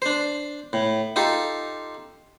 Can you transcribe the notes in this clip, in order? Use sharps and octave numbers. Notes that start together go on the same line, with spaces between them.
D4 C5
A2
D#4 F4 G4 A4